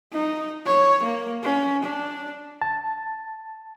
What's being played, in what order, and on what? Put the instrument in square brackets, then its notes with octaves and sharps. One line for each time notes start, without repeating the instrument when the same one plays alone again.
[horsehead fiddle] D#4
C#5
A#3
C#4
D4
[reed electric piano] A5